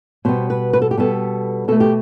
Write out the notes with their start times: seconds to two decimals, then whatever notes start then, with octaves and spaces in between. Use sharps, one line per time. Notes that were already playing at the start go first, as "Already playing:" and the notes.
0.25 B2 G3 B3 C5
0.50 B4
0.73 B4
0.82 A4
0.91 G4
0.97 B2 G3 B3 A4
1.68 B2 A3 A4
1.80 G4